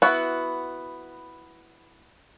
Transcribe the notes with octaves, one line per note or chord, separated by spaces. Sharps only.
B3 E4 F#4 F#5